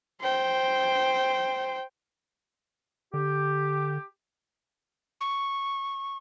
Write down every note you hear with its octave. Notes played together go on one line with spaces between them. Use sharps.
C5 G5
D3 G4
C#6